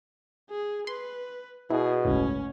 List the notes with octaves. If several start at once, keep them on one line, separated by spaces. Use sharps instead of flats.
G#4
B4 C6
B2 E4 G#4
G1 C#2 A2 C#4